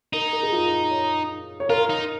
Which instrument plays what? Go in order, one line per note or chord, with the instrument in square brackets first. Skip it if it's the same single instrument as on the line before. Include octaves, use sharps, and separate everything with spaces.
[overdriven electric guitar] D#4 [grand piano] A#4
[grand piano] A#4
G#4
F4
C#5
C#5
[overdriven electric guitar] F4 [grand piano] A#4
[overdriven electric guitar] D#4